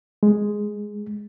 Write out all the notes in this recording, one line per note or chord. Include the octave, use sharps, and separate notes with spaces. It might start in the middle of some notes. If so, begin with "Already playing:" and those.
G#3